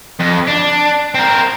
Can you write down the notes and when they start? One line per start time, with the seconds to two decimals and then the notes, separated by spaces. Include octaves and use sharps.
0.19 F2
0.47 D4
1.15 C4 A#4